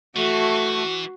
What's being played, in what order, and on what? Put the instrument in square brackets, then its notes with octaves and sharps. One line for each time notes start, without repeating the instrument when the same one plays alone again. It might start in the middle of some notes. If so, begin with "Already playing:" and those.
[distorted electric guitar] E3 [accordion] A3 [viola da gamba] F#4